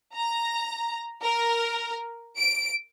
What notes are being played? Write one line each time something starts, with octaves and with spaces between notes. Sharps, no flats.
A#5
A#4
D7